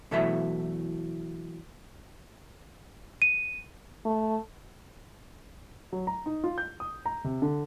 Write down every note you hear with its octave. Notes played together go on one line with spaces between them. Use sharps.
B2 E3 F#3 A3 E4 E5
D#7
A3
F#3
A#5
D#4
F4
G6
D#6
A#5
C3
D3